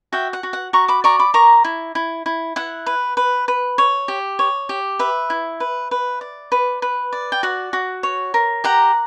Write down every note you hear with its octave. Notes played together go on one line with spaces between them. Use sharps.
F#4 E5 G5
F#5
F#4
F#5
F#4 A#5 C#6
B5 D6
D5 A#5 C#6
B5 D6
A#4 A#5 C#6
E4
E4
E4
E4 F#5
B4
B4
B4
C#5
G4
C#5
G4
B4 E5
E4
B4
B4
D5
B4
B4
D5
G5
F#4 F#5
F#4
C#5
A#4
G4 F#5 A#5